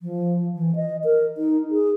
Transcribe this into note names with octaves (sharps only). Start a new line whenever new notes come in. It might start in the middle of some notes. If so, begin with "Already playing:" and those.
F3
E3
D#5
A#4
D#4
G#4